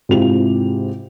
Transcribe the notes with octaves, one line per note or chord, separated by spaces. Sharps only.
G#2 C3 E4 F4 G4 F7